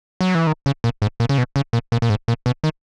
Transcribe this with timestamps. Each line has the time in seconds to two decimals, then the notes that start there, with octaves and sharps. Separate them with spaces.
0.21 F#3
0.35 E3
0.47 D#3
0.66 C#3
0.84 A#2
1.02 G#2
1.20 A#2
1.29 C#3
1.38 B2
1.56 C#3
1.73 A#2
1.92 A#2
2.02 A#2
2.10 G#2
2.28 A#2
2.46 B2
2.64 D#3